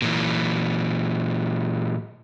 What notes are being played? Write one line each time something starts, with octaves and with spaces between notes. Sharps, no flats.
A#2 E3